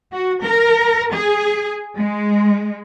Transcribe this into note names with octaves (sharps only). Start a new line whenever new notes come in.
F#4
A#4
G#4
G#3